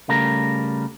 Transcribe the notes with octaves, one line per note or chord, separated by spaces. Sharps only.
C#3 G3 A3 A#4